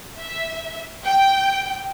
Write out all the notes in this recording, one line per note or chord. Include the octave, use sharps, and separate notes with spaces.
E5
G5